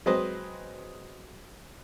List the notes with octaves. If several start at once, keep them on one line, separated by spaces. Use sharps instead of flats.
F#3 G#3 C4 B4 C5 D#5